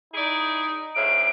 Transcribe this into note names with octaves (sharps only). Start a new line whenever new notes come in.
D#4 E4 G#4 D5
D2 A2 C#3 D7